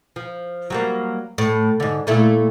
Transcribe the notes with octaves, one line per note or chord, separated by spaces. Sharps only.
F3
F#3 G3 A#3
A2
G#2 D3
A#2 A3 E4